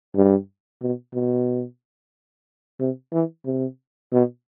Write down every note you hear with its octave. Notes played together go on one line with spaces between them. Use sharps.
G2
B2
B2
C3
E3
C3
B2